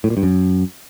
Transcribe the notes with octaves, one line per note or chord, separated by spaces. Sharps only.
A2
A#2
G2
F#2